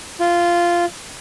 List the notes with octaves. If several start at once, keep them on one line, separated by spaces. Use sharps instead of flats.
F4